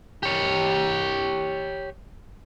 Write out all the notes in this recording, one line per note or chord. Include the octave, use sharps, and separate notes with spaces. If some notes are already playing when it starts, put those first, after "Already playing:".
G4 C#5